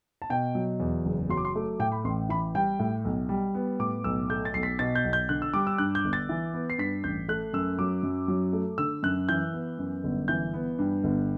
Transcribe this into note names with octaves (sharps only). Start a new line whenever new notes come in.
A5
B2 G5
F#3
E2
F#1
F#3 C6
D6
C6
A3
A2 G5
B5
A1 C6
E3 B5
G3 G5
A2
B1
G3
B3
A2 D6
B1 E6
A3 G6
A6
B1 C7
B6
B2 A6
G6
B1
G6
D3 F#6
E6
G3 D6
E6
G2 F#6
G6
G1
A6
E3
B3
C7
G2 B6
A1 G6
A3 F#6
F#2 E6
F#3 D6
F#2
F#3
A3
D3 E6
F#2 F#6
E3 G6
B3
F#2
G1
E3 G6
B3
G2
G1